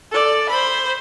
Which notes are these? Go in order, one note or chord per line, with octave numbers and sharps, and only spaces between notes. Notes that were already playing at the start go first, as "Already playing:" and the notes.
A4 D5
C5 B5